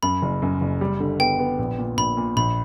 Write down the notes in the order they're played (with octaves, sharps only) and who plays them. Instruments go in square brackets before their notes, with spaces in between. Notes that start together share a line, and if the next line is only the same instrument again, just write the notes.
[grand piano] F#2 [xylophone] B5
[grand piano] F#1
F#2
F#1
G3
D3
[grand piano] B3 [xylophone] G5
[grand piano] B3
A#1
A#2
[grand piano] A#1 [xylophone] B5
[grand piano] A#2
[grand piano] A#1 [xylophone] B5